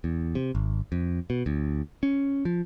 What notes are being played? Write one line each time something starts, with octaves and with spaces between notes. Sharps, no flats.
E2
C3
G#1
F2
B2
D2
C#4
F3